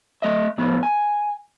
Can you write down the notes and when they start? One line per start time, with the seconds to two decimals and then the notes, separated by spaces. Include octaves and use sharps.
0.22 A3 D#5 E5
0.58 A2 F3 B3
0.83 G#5